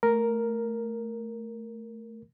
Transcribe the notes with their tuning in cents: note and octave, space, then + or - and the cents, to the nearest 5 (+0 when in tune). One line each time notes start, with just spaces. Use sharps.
A3 +0 A#4 +0